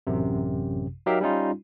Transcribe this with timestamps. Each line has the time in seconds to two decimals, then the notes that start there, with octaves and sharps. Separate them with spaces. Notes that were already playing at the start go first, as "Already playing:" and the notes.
0.07 A1 F#2 C3
1.06 F#3 D#4 G4 A#4 E5 F5
1.21 G3 C#4 D#4 F4